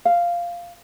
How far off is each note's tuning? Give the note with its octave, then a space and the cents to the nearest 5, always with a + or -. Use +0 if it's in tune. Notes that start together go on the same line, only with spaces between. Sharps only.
F5 -5